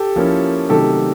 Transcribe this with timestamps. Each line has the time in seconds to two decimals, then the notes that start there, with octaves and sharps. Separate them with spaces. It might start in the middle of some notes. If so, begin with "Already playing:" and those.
Already playing: G4 A4
0.16 F3 A#3 C#4 E4
0.69 C3 D#3 F#3 A3 G4 A4